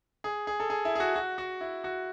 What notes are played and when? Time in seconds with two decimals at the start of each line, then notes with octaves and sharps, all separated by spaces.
0.24 G#4
0.47 G#4
0.60 A4
0.70 G#4
0.85 E4
0.95 G#4
1.00 F#4
1.16 F#4
1.38 F#4
1.61 E4
1.84 F#4